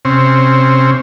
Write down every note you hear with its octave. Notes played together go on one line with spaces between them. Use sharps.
C3 C4 C#4